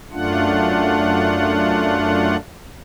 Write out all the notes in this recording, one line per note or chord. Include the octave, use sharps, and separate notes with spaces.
F#2 A3 D4 F4 F#5